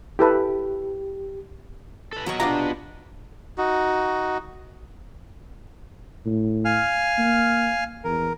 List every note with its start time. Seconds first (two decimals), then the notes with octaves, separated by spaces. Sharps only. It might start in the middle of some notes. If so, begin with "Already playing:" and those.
0.19 E4 G4 A4 B4
2.13 A4 B4
2.26 F#3 B3 F#4 A#4 D#5 C#6
2.40 D4 F4 G4 B4 D5 F#5 A#5
3.58 D#4 F#4
6.25 A2
6.65 F5 G#5 F6
7.18 A#3
8.04 E2 A#4